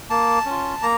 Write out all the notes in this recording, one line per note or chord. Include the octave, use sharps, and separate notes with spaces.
A#3 A5
C#4 F4
A#3 A#5